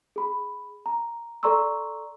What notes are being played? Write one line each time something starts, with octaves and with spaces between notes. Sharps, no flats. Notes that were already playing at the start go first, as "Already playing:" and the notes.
G#4 B5
A#5
A4 D5 A#5 C6 C#6 E6